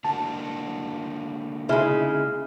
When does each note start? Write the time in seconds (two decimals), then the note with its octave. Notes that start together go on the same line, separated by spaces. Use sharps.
0.05 D3 A#3 F#4 A5
1.69 C#3 G#3 D#4 E4